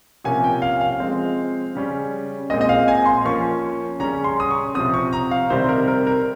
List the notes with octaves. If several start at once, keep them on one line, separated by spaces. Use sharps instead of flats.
C3 F3 A#3 C#4 G#5
G5
F5
F5
F3 G#3 C4
C#3 G3 C#4
A#2 G#3 C4 D#5
D#5
F5
G#5
C6
F3 A#3 C#4 C#6
C#3 G3 C#4 A#5
C6
D#6
C#6
C3 F3 C4 D#6
C#6
A#5
F5
C3 D#3 G3 C4 C5
A#4
A#4
A#4